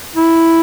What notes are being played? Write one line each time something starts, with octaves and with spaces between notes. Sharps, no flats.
E4